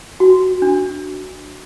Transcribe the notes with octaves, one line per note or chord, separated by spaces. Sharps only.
F#4
D4